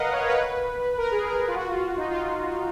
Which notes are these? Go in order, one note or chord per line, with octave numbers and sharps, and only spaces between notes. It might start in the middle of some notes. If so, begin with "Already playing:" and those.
Already playing: A#4 B4 D#5 F5 F#5
C#5
B4
A#4
G#4
A#4
G#4
F4
F#4
F4
D#4
F4